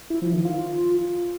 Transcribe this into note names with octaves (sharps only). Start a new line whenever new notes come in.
E4
F3
D#3
F4